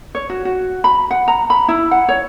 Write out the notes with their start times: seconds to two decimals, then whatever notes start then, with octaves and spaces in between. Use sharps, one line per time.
0.15 C#5
0.30 F#4
0.45 F#4
0.84 B5
1.11 F#5
1.28 A#5
1.50 B5
1.68 E4
1.91 F#5
2.09 C#5